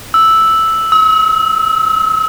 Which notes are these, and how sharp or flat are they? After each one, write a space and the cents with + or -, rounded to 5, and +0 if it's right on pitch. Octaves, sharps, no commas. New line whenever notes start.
E6 -5
E6 -45